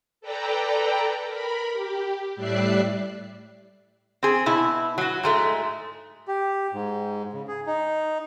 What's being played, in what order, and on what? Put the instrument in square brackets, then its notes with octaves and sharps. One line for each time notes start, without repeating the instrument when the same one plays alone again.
[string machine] A4 B4 D5 G5 A#5
A#4 B5
G4
A2 G3 D5 E5 F#6 C7
[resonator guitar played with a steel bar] C4 G#4
B2 E4
F#3 F#4
G#2 G#3 A3
[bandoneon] G4
G#2
C#3
G#4
D#4